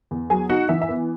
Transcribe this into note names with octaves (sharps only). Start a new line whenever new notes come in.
E2
F#3 G#4 G#5
D#4 F#4 F#5
E3 E5
E5
B3